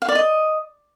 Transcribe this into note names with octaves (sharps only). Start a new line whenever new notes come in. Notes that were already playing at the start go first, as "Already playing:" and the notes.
F5
D5
D#5